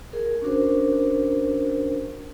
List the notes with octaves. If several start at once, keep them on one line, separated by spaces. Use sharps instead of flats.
G#4 A#4
C#4 D4 F#4 A#4 C5